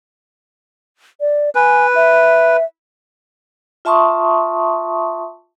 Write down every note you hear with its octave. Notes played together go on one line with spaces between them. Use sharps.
D5
B4 G#5
E5
F4 E5 A5 C6 C#6 D#6